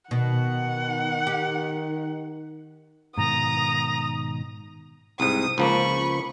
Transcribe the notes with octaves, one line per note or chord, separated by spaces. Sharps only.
B2 D#3 F#5
G4
G#2 B2 D#3 A#5 D#6
C2 G#2 D#6
C#2 F3 A#3 B5 C#6